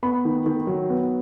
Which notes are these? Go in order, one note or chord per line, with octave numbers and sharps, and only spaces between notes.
B3 B5
D#3
D#3
F#3
B3